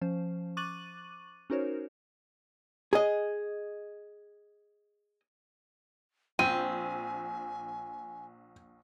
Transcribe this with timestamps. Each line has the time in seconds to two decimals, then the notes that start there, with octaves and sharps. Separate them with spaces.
0.01 F3 C#4 C5
0.57 C#6 D6 F#6 A6 D#7 F#7
1.50 C#4 D#4 F#4 A#4 C5 C#5
2.93 G#4 D#5
6.39 A#1 C4 G#5 D#7